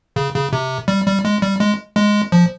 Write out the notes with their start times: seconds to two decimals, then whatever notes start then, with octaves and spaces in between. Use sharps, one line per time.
0.16 C#3
0.35 C#3
0.53 C3
0.88 G3
1.06 G3
1.25 G#3
1.42 G3
1.60 G#3
1.96 G#3
2.32 F3